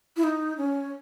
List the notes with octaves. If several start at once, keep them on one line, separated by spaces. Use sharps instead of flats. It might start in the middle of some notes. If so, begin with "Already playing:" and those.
E4
D#4
C#4